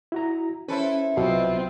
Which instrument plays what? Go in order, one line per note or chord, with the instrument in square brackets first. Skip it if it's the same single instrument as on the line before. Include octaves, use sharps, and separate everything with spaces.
[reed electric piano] E4 F#4 A#5
[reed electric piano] C#4 C5 [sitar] E4 A4 B4
[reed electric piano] C2 F#3 E5 [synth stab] B2 [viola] C4 F4